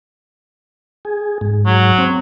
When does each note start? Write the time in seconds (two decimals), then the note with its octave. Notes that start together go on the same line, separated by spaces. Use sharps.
1.05 G#4
1.41 G#2
1.66 F#3
1.98 C4